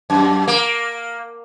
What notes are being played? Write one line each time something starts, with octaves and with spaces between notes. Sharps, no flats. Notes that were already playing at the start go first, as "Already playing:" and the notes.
F#2
A#3